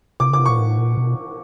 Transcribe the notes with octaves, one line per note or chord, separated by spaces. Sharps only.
C3 D6
C#3 D6
C3
A#2 C#6
A2
A#2
B2